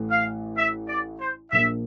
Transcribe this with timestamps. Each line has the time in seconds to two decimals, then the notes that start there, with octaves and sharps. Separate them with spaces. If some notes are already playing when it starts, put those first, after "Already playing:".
Already playing: A1 A2 E3 A3
0.11 F5
0.58 E5
0.89 D5
1.20 C5
1.52 A#1 A#2 F3 A#3 D4 E5